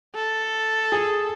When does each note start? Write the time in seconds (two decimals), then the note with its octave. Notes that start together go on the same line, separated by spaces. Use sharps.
0.15 A4
0.92 G#4